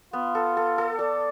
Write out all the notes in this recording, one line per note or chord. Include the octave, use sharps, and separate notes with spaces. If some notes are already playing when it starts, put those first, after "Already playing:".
B3 F4
A4
A4
A4
A4 D5